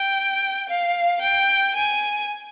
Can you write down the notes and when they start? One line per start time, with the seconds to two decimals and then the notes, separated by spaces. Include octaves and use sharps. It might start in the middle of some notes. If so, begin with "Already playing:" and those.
Already playing: G5
0.69 F5
1.22 G5
1.75 G#5